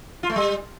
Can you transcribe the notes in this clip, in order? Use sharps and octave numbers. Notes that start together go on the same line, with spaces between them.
F4
A3
G3